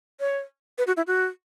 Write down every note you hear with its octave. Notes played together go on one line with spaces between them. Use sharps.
C#5
B4
F#4
E4
F#4